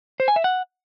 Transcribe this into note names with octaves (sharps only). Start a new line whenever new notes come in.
C5
G#5
E5
F#5